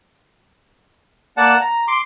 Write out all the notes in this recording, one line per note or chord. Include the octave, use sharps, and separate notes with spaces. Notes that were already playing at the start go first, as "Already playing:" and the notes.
A#3 D5 F#5 A5
A#5
C6 D6